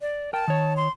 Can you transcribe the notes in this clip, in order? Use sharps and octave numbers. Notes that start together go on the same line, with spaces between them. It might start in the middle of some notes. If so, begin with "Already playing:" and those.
D5
A#4 G5 A5
D#3 C#5
C6